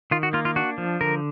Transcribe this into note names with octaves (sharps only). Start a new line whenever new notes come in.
D#3 F4
F#4
A#3 F4
F4
D4 F#4
F3
D3 A#4